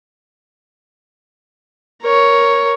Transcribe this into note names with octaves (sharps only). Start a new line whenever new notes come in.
A#4 C#5